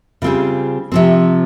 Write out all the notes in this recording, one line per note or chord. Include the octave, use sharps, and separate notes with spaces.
C#3 G3 C4 F4 G#4
C3 F3 C4